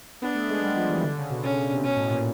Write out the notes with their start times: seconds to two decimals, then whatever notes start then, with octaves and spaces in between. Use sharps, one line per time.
0.22 B3 D4
0.35 A3
0.49 G#3
0.62 G3
0.76 F3
0.89 E3
1.03 D3
1.16 C#3
1.30 B2
1.43 C#4
1.73 C3
1.84 B2 C#4
1.96 A2
2.10 A#2